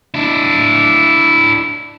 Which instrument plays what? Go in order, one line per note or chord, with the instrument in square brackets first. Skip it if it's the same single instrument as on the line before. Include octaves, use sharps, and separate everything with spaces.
[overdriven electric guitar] D4 E4